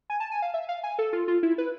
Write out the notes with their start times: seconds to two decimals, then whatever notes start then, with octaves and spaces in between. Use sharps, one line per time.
0.10 G#5
0.20 A5
0.31 G#5
0.42 F5
0.54 E5
0.69 F5
0.84 G#5
0.99 A4
1.13 F4
1.28 F4
1.43 E4
1.58 B4